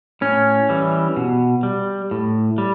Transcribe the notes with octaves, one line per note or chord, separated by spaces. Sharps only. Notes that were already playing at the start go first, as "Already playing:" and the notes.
A2 C#4
E3 G3
B2
G3
A2
G3